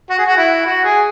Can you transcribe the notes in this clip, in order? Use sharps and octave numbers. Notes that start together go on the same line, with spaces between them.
F#4
G#4
F#4
E4
F#4
G#4